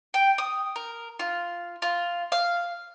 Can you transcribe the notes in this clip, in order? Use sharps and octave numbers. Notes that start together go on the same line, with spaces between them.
G5
D#6
A#4
F4
F4
F5